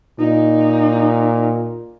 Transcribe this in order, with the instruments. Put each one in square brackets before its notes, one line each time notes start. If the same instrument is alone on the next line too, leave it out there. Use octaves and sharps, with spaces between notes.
[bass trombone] A#2 [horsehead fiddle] D#4